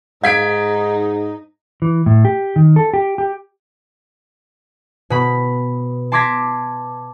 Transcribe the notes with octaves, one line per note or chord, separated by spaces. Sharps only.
G#2 D#4 F5 G#6 B6 D7
E3
A2
G4
D#3
A4
G4
G4
B2 B5
A5 C6 D6 G#6 A#6 B6